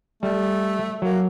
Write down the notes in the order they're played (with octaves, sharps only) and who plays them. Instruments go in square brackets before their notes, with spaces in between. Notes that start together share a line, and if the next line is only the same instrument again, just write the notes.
[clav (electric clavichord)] G3 [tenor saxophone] A3
[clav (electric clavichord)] F#3 [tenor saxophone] A#3